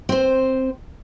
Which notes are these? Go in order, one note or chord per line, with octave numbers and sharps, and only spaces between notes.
C4 C5